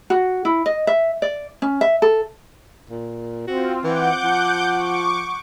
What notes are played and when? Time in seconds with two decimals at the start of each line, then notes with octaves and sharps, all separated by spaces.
0.10 F#4
0.45 E4
0.66 D#5
0.87 E5
1.22 D5
1.62 C#4
1.81 E5
2.02 A4
2.90 A#2
3.47 C4 F4 F#4
3.84 E3 F#5 D6 G6
4.24 F3
4.73 C#6 D6